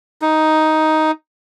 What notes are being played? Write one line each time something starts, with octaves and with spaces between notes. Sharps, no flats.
D#4